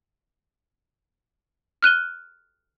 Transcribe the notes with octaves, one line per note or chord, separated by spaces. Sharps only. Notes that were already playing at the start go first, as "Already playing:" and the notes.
F6 F#6 D#7 G7